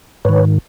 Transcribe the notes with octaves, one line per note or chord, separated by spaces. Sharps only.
G#2 D#3 B4 C#5